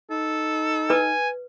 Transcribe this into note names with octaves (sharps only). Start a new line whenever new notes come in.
D#4 A4
B4 G#5